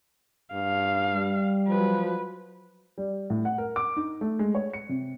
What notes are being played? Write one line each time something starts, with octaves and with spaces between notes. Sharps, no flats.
G2 F5
G3
F3 F#3 B4
G3
A2
F#5
A#4
D6
D#4
A3
G#3
C#5
C#7
C3